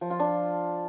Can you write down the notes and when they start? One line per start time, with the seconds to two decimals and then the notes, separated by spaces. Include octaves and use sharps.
0.01 F3
0.10 F4
0.19 D4